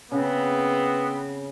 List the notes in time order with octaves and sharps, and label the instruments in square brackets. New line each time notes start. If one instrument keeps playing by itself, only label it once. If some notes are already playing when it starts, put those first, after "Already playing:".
[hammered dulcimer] C#3 [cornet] B3 [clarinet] C4